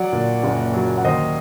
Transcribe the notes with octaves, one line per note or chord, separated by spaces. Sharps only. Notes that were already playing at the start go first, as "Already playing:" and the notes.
Already playing: F#3 D5 F#5
A#2
F#1
F#3
F#5
D#2 C5 D#5